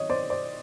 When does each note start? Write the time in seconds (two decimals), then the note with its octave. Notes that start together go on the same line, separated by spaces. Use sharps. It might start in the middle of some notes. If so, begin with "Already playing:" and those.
Already playing: D#3 F#3 C#5 D#5
0.10 C5 D5
0.30 C5 D5